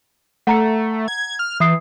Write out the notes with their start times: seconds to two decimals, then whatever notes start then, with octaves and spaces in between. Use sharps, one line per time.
0.47 A3 F#5 A#5 C#7
1.08 G#6
1.39 F6
1.60 E3 E5 D#6 C7